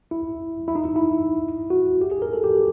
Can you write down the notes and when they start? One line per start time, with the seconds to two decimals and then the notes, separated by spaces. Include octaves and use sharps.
0.11 E4
0.68 E4
0.75 D#4
0.85 E4
0.96 E4
1.70 F#4
2.01 G4
2.11 G#4
2.22 A#4
2.33 A4
2.44 G4